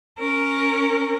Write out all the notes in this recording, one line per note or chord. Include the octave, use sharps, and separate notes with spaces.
C#4 A#4